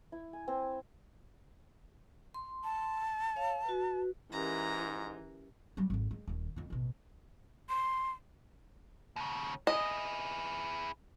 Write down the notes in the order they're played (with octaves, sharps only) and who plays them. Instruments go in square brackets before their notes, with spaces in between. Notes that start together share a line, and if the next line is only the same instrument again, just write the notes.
[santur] E4
G#5
C4
[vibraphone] C6
[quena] A5
[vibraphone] C#5 F5
F#4 B4
[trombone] G#2 [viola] E3 [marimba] C#4 G4 A#4 [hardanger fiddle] A#5
[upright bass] F#3 G3
G#1 F2
G#3
D#1 D#3
F2 D3
A1 B2
[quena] C6
[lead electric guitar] D#2 C#3
[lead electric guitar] E4 G#4 [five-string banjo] D#5